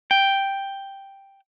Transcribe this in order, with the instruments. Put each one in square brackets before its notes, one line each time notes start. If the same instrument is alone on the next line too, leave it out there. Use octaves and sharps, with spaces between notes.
[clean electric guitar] G5